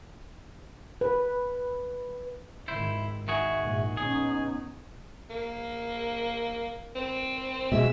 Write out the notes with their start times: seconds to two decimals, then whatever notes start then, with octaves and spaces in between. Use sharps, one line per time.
1.01 B4
2.68 G#1 D#3 E4 C5
3.28 D#3 F#4 G#4 E5
3.58 A#1 G#2
3.97 B3 C#4 D#4 G#4
5.30 A#3
6.96 C4
7.72 B2 G#3 E5